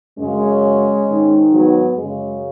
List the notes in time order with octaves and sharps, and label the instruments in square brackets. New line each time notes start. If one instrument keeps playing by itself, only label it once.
[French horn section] F#2 C#3 G#3 C#4
G#2 D#3
F#3 B3
F#2 C#3 G#3